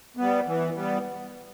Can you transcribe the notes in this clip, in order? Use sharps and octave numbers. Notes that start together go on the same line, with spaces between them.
G3 B3
E3
G3 B3